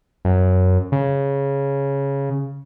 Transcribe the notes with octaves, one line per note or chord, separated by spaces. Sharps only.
F#2
C#3